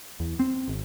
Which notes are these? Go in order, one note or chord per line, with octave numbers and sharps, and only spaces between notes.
E2
C4
G#1